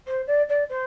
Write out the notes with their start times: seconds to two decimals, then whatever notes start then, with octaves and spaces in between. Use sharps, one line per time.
0.07 C5
0.27 D5
0.49 D5
0.70 C5